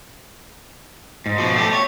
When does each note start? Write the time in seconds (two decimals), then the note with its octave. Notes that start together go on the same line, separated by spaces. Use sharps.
1.26 G#2
1.38 B2 F3
1.56 A3 G4
1.73 C#5